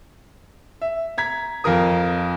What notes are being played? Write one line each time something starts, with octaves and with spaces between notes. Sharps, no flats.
E5
A#5 G#6 B6
F2 F4 A#4 D#6